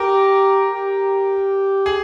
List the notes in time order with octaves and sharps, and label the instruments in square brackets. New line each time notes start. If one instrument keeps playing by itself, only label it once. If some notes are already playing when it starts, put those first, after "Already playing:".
Already playing: [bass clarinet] G4 [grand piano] A#4
[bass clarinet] G4
[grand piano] G#4